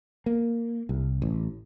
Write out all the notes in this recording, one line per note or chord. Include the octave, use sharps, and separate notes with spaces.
A#3
C2
A1